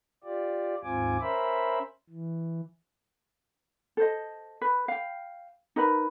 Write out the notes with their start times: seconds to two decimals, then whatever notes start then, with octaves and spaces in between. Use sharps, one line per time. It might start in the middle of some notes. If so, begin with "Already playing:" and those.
0.24 F4 G4 D5
0.83 D#2 G#2 C4 F4 G#5 D6
1.21 C#4 A#4 C5 E5 B5
2.10 E3
3.97 A4 C5 D#5
4.61 B4
4.88 F5 G5
5.76 D#4 A#4 B4 B5